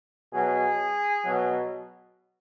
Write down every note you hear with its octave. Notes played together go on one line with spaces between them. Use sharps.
B2 F#3 G#4
B2 F#3